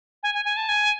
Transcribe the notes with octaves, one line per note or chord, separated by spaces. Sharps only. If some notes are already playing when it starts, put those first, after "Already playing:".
G#5
G#5
G#5
A5
G#5